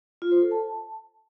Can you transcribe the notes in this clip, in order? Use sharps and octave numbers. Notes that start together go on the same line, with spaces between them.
F4
C5
A4
A5